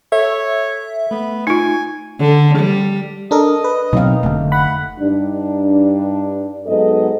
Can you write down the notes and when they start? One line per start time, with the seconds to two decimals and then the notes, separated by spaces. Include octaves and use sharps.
0.12 A4 C#5 E5
1.11 A3 B3
1.47 D#4 F4 G#5
2.20 D3
2.59 G3
3.31 D4 A4 A#4 D#5
3.64 B4
3.93 B2 F#3 C4 D#4 F5
4.23 F1 B2 D3 A3
4.52 F#5 B5
5.00 G2 D4 D#4
6.67 G#2 F#3 B3 A4 D#5